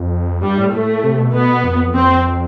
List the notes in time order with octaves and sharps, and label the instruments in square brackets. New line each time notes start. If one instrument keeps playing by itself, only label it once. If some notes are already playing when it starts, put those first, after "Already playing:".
Already playing: [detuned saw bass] F2
[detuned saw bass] G2 [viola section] G3
[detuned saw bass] A2
[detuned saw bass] A2 [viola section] A3
[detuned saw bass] C3
B2
[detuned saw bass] B2 [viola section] B3
[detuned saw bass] F2
[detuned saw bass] F2 [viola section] C4